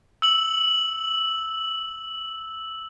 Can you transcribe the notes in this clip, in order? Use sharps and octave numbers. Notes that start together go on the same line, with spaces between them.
E6 F#7